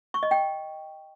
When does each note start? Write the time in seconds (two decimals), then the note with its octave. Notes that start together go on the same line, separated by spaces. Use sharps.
0.14 C#6
0.23 D#5
0.31 G5